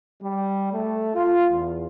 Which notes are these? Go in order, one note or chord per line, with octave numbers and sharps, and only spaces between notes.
G3
A3
F4
E2